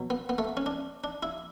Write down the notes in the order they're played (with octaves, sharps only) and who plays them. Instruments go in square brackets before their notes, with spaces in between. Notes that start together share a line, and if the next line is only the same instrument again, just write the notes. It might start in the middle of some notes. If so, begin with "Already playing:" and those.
Already playing: [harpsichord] B2 F#3
B3
B3
A3
C#4
D4
D4
E4